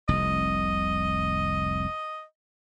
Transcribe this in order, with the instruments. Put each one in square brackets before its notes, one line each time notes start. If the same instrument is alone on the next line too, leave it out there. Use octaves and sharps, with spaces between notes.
[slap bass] F1 C2 [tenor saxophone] D#5